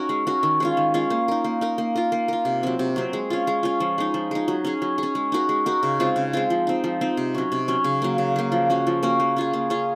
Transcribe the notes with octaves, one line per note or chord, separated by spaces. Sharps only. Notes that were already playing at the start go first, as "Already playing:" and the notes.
Already playing: C#4 D#4 F#4 A#4
G#3
C#4 F#4 A#4
D#3
G#3 C#4 F4
D#3
G#3 C#4 F4
A#3
D#4 A#4
A#3
D#4 A#4
A#3
F4 A#4
A#3
F4 A#4
C3
F#3 C4
C3
F#3 C4
G#3
C#4 F4
G#3
C#4 F4
F3
G#3 D#4
F3
G#3 D#4
F#3
C#4 G#4
F#3
C#4 G#4
G#3
D#4 F#4 A#4
G#3
D#4 F#4 A#4
C#3
G#3 C4 F4
C#3
G#3 C4 F4
F3
C4 D#4
F3
C4 D#4
C3
F#3 C#4
C3
F#3 C#4
C#3
F#3 A#3
C#3
F#3 A#3
F3
A#3 C#4 F#4
F3
A#3 C#4 F#4
A#3
C#4 F4 G#4
A#3
C#4 F4 G#4